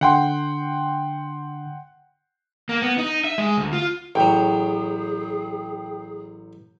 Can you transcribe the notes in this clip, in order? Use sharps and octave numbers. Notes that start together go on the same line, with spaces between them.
D3 F#5 G5 C6
A#3
B3
D#4
E5
G#3
D2
F4
A1 F#3 G#4 G5